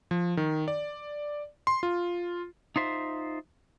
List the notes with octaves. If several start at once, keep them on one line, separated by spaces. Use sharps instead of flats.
F3
D#3
D5
C6
F4
D#4 F4 C5 E5